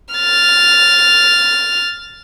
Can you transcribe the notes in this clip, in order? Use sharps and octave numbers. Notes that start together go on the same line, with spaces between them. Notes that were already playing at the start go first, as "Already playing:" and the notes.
F6 A6